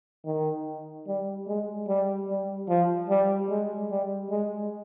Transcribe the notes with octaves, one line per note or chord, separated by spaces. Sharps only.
D#3
G3
G#3
G3
G3
F3
G3
G#3
G3
G#3